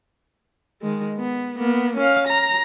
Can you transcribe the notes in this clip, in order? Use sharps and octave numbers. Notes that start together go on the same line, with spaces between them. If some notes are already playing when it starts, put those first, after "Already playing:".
D#3 G#3
B3
A#3 B3
C#4 F5
A#5